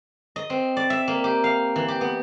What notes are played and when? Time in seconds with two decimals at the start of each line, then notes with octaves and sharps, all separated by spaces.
0.36 D#5
0.50 C4
0.77 D5
0.90 E5
1.08 A#3
1.24 G4
1.44 F5
1.76 E3
1.88 G4
2.01 B3